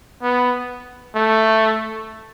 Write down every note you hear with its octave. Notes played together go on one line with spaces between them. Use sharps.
B3
A3